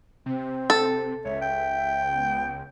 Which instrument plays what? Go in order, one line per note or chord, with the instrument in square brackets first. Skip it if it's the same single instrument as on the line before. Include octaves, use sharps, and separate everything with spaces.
[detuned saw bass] C3 [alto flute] C4
[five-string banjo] A4
[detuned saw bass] C#2 [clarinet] C#5 [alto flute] E5
[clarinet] G5
[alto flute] B3